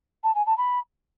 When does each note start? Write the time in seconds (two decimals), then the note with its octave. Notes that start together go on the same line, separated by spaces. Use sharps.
0.23 A5
0.35 G#5
0.46 A5
0.57 B5